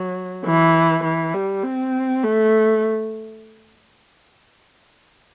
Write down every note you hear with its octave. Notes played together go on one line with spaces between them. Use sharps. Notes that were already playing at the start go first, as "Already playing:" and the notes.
Already playing: F#3
E3
E3
G3
C4
A3